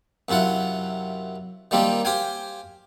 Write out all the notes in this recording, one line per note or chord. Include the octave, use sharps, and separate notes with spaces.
F#2 C3 E4 F4 F#5
D#3 G3 A#3 C4 F4 G4
G4 C5 F5 G5 G#5